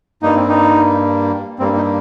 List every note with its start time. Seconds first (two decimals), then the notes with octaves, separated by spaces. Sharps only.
0.23 G2 G3 A#3 D#4
0.35 C4
0.48 D#4
1.59 G2 G3 A#3 C4
1.76 D#4